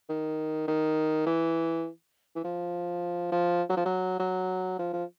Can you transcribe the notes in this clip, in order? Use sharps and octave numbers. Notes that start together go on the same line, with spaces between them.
D#3
D#3
E3
E3
F3
F3
F#3
F3
F#3
F#3
F3
F3